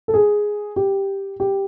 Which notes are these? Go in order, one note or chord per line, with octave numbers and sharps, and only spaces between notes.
A4
G#4
G4
G4